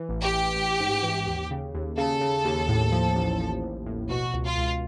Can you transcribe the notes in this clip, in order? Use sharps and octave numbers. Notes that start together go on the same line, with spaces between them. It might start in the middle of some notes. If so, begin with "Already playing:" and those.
Already playing: E3
A1
G4
E3
A1
G#2
E3
D#2
C#3
D#2
C#3 A4
C#3
D#2
A2
F3
A1
F3
A1
A2
B2 F#4
C#2
F4
C#2